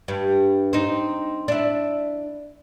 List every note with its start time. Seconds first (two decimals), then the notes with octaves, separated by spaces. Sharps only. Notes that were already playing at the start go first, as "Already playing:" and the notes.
0.08 G2
0.73 C4 D#4
1.48 D4 E4